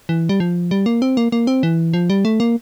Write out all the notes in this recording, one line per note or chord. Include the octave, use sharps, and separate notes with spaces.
E3
G3
F3
G3
A#3
C4
A#3
A#3
C4
E3
F3
G3
A3
A#3